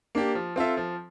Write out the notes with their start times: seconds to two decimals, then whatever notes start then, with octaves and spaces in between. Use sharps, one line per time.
0.15 A#3 D4 G4
0.35 F3
0.56 C4 F4 A4 E5
0.77 F3